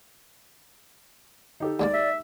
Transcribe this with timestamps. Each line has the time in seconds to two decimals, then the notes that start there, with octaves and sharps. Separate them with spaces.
1.60 D#4 G4 A4
1.80 D#2 G#3 A#3 D5
1.93 E5